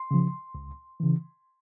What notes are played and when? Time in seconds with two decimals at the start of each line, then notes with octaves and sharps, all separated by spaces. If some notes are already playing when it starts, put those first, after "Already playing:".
Already playing: C6
0.11 C#3 F3
0.55 C#2
1.00 C#3 E3